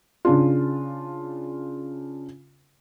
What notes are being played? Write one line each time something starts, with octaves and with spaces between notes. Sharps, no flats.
C#3 D4 F4